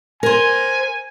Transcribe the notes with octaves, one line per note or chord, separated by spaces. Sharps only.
A#4 C5 G#5